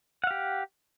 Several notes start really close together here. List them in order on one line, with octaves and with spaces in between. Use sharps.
F#5 F5 G4